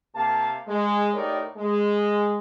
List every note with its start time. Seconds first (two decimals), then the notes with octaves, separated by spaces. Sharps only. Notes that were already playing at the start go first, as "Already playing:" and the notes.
0.15 C3 A#3 F5 A5
0.67 G#3
1.14 A2 D#4 G4 A#4 C#5 D5
1.57 G#3